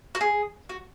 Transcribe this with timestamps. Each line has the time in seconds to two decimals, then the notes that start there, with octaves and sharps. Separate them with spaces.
0.15 F#4
0.21 G#4
0.69 F#4